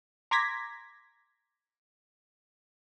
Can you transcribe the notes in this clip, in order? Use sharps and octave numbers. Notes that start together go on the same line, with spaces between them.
A#5 C6 D6 G#6 A#6 B6